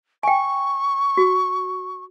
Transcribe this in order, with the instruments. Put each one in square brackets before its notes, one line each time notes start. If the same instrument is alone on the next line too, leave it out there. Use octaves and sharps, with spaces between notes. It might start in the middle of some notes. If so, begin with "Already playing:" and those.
[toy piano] G5 G#5 [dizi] C#6
[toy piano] F#4